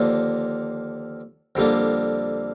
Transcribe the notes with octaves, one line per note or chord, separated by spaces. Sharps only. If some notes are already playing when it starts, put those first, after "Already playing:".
Already playing: D#2 D3 F3 A#3 D4
F2 D3 G3 A#3 D4